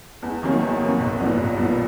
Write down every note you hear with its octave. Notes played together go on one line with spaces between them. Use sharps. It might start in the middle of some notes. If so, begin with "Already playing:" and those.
E2
C3 D#3 F#3 A#3
E2
C3 D#3 F#3 A#3
B1
A#2 G3 B3
B1
A#2 G3 B3